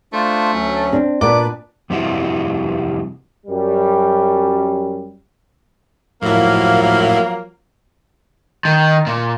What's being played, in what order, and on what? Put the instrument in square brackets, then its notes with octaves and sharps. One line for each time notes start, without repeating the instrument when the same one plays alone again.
[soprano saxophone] A3 [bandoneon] D4 F4 C5
[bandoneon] D2 F#3 C#4
[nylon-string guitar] C4 D4
[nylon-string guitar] A#2 B3 [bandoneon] D4 B4 [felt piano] D5 [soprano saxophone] D6
[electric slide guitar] F2 C3 E3 G3 E4 F#4
[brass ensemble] F#2 G3
[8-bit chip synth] A2 E4 [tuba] F3 [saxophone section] F#3 A#3
[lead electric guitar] D#3
A#2